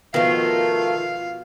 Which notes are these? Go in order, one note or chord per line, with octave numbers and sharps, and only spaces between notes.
B2 D#3 F3 A3 F4 F5